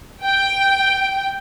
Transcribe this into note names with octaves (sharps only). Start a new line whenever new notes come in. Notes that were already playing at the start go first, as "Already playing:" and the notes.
G5